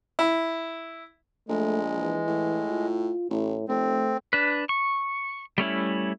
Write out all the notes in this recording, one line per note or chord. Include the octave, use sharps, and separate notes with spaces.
E4
A#1 G#3 A3
E3
A2
F4
A1 A2
F1 A3 C4
D4 B4
C#6
G3 A3 C#4 E4